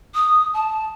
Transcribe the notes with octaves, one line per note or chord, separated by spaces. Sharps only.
D#6
A5